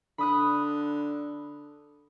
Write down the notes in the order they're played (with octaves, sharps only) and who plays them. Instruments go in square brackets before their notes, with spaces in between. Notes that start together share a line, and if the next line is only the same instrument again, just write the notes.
[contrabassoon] D3 [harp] B5 D#6 F#6